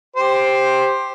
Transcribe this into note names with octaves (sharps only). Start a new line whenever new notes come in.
G4 C5